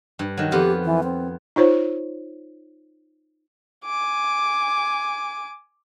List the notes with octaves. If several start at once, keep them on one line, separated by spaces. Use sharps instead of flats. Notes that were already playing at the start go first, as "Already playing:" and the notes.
G2
D#3 F#3
F2 B3 F4 G4
E3
C4
D#4 F4 C5 C#5
G#5 D6